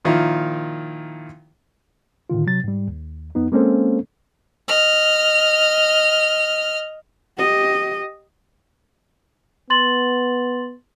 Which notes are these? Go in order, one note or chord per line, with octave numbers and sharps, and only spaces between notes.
A#2 D#3 F3 E4 F4
A2 D3 D#3 F4
C3 F#3 A6
G#2 G3
D#2
F2 B3 D#4
G#3 A#3 C4 C#4 A4 C5
D#5 F6
G4 D#5
B3 C6 A6 F#7